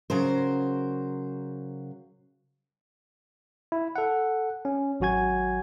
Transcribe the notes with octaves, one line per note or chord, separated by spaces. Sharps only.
C#3 F#3 A#4 C5
E4
A4 F#5
C#4
G#1 F#3 F#4 G#5 G#6